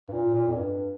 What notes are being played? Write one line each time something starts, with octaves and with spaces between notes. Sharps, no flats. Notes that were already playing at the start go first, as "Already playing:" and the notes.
G2
A#2
A#2
F2
G2